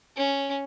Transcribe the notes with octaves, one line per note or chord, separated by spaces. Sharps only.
C#4